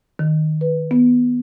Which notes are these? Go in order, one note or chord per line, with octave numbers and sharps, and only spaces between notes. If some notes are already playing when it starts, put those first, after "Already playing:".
D#3
B4
B3